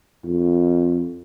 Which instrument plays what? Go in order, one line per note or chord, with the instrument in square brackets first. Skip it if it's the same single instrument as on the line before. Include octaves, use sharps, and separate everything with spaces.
[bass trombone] F2